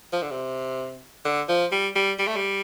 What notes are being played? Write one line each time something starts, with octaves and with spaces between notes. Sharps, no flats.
F3
D3
C3
D3
F3
G3
G3
G3
A3
G3